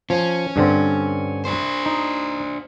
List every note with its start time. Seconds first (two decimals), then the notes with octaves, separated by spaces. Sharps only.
0.10 F3 C#4
0.56 G2 D3 C4
1.45 D4 C5
1.86 D#4